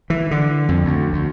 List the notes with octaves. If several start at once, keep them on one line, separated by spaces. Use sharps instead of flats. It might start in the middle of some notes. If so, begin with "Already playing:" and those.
E3
D3
F2
D2
D2